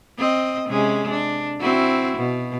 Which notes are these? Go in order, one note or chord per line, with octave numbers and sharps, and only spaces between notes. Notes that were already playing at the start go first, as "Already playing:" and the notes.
C4 D#5
C3 G#3 C#4
D4
C4 E4 F#4
B2